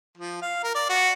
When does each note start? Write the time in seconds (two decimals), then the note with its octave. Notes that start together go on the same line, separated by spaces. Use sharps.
0.18 F3
0.42 F5
0.64 A#4
0.75 D5
0.89 F#4